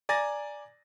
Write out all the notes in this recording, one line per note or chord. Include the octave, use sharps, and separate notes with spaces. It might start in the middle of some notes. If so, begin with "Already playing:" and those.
D5 G#5 A#5 A6 A#6